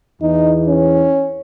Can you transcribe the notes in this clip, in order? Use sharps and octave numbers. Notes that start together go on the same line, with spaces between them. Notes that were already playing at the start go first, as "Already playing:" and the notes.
E2 E3 D#4
C#4